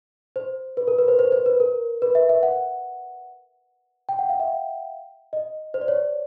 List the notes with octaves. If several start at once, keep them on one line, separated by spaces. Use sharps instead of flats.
C5
B4
A#4
B4
C5
C5
C5
B4
A#4
B4
E5
E5
F#5
G5
F#5
F5
E5
D#5
C5
D5
C#5